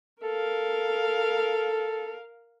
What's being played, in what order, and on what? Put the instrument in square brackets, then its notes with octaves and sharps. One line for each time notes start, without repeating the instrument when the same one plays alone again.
[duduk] A4 [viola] A#4 F5